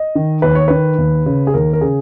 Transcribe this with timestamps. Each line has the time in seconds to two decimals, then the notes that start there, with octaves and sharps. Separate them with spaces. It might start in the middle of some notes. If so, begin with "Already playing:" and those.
Already playing: D#5
0.15 D#3
0.42 D#2 B4
0.55 C#5
0.68 D#3 B4
0.98 D#2
1.26 C#3
1.47 G#4
1.54 D#2 A#4
1.73 A#4
1.81 C#3 G#4